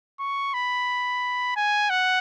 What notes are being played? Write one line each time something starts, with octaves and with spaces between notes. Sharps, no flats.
C#6
B5
G#5
F#5